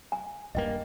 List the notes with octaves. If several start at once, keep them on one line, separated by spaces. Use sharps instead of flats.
G#5
D#1 G2 A#3 D#5 G5